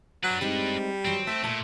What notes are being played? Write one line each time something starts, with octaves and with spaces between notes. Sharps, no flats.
F#3 D4 B4
G3 G#3 C4 D#4
G2 D#3 F#3 C4
A3 C5
A#2 A5